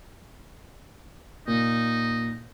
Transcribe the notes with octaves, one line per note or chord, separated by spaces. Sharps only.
A#2 D#4